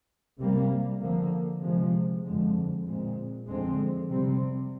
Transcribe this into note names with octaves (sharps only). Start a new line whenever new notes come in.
C3 G3 A#3
D3 F3 A#3
C3 F3 G#3 C4
F2 D3 G#3
A#2 G#3 C4
F2 D3 F3 G#3 C4
C3 G3 C4